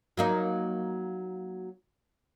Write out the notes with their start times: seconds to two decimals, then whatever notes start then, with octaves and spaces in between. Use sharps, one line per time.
0.17 F#3 A#3 D#4